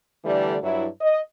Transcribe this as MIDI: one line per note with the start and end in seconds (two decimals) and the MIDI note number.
0.24 0.57 50
0.24 0.57 52
0.24 0.57 55
0.24 0.57 57
0.24 0.57 62
0.63 0.87 43
0.63 0.87 54
0.63 0.87 64
1.01 1.20 75